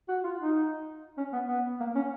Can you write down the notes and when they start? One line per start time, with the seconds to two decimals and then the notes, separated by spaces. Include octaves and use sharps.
0.09 F#4
0.24 F4
0.39 D#4
1.17 C#4
1.33 B3
1.48 B3
1.80 A#3
1.95 C#4